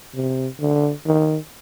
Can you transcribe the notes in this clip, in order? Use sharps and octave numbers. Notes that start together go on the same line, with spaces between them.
C3
D3
D#3